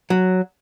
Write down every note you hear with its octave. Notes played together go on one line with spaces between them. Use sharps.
F#3